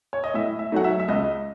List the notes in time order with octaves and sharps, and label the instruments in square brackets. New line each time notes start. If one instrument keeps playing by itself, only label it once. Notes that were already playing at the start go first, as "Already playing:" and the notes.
[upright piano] C#5
D#5
[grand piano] A2 [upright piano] E5
[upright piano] E5
[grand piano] F#3 A3 D#4 [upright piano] F#5
[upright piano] E5
E5
[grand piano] C#2 [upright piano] D#5